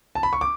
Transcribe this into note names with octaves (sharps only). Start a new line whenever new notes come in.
A5
B5
C#6
D6